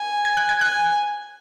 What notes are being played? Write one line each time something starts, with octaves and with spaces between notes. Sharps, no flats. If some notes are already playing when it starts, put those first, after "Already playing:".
Already playing: G#5
G#6
F#6
G#6
G#5 F#6